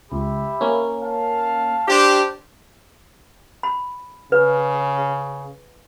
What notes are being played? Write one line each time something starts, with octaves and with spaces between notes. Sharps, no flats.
C#2 G4 E5 B5
A#3 C#4
F5 A5
D4 G4 C5
B5
C#3 B4